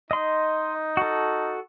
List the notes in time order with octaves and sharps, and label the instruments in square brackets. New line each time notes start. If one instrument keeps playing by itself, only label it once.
[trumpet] D#4 [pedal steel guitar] D#5 C6
[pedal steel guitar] F#4 A4